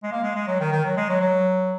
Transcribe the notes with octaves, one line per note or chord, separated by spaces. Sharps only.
G#3
A#3
G#3
G#3
F#3
D#3
D#3
F#3
G#3
F#3
F#3